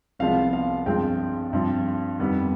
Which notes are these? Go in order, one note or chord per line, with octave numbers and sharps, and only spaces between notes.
C2 C3 F3 G#3 B3 F5
F5
G2 F3 G#3 C4 G5
G2 F3 C4
F2 D#3 G3 B3